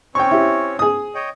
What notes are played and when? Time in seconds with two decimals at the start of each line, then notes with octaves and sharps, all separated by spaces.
0.15 C4 C#4 C#5 G5 C#6
0.31 E4 G4
0.79 G#4 D#6
1.15 C#5 D#5 G5